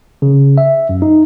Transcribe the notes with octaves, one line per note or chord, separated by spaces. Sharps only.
C#3
E5
F#2
D#4